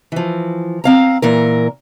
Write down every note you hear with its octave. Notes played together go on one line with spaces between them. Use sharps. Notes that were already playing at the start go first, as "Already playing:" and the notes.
E3 F3
C4 F5 A#5
A#2 E3 A#4